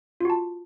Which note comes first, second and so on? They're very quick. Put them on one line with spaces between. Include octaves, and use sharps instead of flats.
F4 F#4 A5